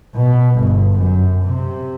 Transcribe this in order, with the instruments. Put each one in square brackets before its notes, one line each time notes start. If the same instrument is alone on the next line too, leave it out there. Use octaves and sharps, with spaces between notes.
[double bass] B2
G1
F#2
C3